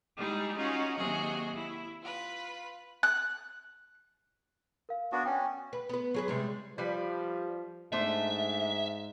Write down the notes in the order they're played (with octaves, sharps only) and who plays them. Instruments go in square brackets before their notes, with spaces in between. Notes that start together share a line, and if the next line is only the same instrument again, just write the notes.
[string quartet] G3 G#3 D#4 E4 G#4
C#4 D#4 F4 F#4 G#4
D#2 C3 F#3 F#4 G#4 D#5
E4
F4 B4
[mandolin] F#6
[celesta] A#4 F5
[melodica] B3 D4 F#4
[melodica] C#4 [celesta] G5
[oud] B4
B3 B4
F#3 G#4 B4
C3 G3 G#3
[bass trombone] F3 [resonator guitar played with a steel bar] G3 B4
[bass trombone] G#2 [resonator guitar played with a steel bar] A3 D4 C5 [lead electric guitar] E5